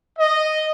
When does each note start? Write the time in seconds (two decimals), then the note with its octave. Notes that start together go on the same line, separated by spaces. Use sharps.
0.18 D#5